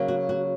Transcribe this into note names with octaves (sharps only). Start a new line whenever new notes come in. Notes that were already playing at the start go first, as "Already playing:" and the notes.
Already playing: C#3 F#3 A#3
F#4
F#4